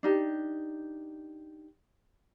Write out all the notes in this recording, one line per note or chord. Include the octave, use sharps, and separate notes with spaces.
D4 D#4 G4